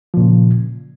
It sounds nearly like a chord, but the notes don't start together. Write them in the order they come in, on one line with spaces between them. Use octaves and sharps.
F3 A#2 C#3